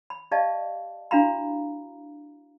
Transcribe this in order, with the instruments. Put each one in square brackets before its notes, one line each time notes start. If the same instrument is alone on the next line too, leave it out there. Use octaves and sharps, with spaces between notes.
[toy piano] B5
G4 D5 D#5 F5 A5
D4 E4 F#4 F5 A#5 B5